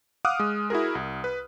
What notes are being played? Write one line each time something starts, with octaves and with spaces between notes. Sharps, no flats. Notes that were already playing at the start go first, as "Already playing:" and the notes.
F5 F#5 D6 D#6 F6 F#6
G#3
E4 F#4 G#4 A#4
C2
B4